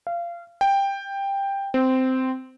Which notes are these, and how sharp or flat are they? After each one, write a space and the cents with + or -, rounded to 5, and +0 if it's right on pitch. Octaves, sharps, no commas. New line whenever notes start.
F5 -25
G5 +10
C4 -10